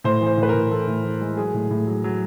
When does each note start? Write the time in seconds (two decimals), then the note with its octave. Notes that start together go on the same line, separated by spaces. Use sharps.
0.04 A2 C5
0.21 E3
0.27 C5
0.37 A2
0.43 B4
0.49 A2 A#4
0.71 E3 A4
0.87 A2
1.04 E3
1.21 G#3
1.37 F#3 G#4
1.54 A2
1.70 A2
1.87 F#3
2.04 F#3